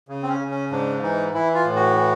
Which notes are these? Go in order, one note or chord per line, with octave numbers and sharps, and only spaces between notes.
C#3
C4
C#4
C#3
C#4
G#2 D4
E3 D#4
E3 E4
F4
A2
F#4
E3